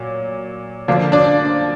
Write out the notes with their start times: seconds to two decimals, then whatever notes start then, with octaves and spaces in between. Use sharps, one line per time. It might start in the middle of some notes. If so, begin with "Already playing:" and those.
Already playing: A#2 F#3
0.88 D3 F3 A#3 D4
1.12 D4 D5